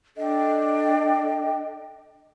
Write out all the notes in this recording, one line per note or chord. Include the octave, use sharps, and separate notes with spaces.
D4 A4 D#5 G5